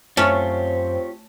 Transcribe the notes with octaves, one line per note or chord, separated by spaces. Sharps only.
F#2 A3 C4 C#4 F4 G4 C#5